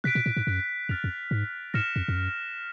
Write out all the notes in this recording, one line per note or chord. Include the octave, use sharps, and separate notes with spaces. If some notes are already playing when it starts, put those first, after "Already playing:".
B2 F#6 B6 D7
A#2
A2
G#2
F#2
F2 F6 A6 D7 F7
F2
G#2
G#2 F6 A#6 C#7 E7
F2
F2
F#2